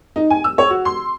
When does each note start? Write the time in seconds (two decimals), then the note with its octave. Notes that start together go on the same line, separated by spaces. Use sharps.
0.16 D#4
0.30 G#5
0.44 E6
0.58 C#5
0.70 F#4
0.85 C6